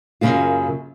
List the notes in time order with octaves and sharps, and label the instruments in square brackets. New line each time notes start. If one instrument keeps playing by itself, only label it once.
[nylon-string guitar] F#2 A#2 C#3 A#3 F4